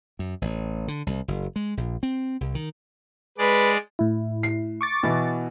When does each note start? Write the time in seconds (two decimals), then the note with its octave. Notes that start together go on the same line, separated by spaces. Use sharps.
0.19 F#2
0.42 A1
0.88 D3
1.07 C2
1.28 F#1
1.56 G#3
1.77 A#1
2.03 C4
2.41 C2
2.55 D#3
3.38 G#3 B4 D5
3.99 A2 E4
4.43 C7
4.81 C#6 D6 A6
5.03 B2 E3 B3